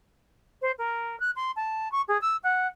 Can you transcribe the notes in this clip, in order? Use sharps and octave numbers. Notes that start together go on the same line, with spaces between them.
C5
A#4
F#6
C6
A5
C#6
G#4
E6
F#5